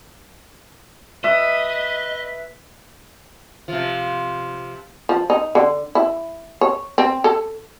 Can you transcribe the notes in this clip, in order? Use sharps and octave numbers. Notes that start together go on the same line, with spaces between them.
B4 D#5 E5
C3 F3
F3
D#4
D3
E4
C#5
C4
A4